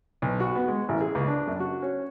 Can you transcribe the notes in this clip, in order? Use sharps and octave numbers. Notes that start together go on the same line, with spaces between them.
B1
F#4
B3
G#3
A1
G#4
C#2
D4
F#2
F#4
C#4